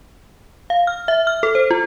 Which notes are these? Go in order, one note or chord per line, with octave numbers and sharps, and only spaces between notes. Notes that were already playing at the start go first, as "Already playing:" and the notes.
F5
F6
E5
F6
A4
C5
F4